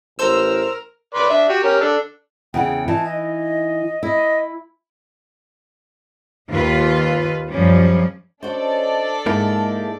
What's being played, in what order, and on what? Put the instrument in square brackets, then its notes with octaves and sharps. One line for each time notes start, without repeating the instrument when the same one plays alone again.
[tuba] A1 [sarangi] A#4 [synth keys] C5 E6
[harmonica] B4 D5 C6
D4 E5
F#4 G4
C#4 G4 A#4
D4 A4
[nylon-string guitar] E2 C#3 F#5 [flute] G5
[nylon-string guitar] E3 D#4 [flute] A5
[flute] D#5
[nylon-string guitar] E4 [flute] D#5
[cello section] D#2 F4 B4
F#2 F3 G3 C#4
[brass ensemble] C#4 D#5 [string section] D4 A4 D5 [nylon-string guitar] F#4 C5
[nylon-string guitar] G#2 [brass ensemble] G#3 [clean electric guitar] A#3 D#4 E4